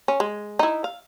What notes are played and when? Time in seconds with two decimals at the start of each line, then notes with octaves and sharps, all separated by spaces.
0.08 C#4
0.20 G#3
0.59 D#4 E4
0.84 F5